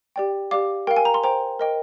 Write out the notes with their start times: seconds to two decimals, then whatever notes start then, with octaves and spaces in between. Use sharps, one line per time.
0.16 G4 D5 G5
0.51 G4 D5 F5 D6
0.87 A#4 F5 G5
0.96 G#5
1.05 A#5
1.14 C6
1.23 C5 G5 A#5
1.60 A#4 D#5 G5